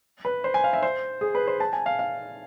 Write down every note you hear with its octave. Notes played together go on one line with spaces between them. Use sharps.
B4
C5
G#5
F5
E5
C5
G#4
B4
C5
A5
G#5
F5
F5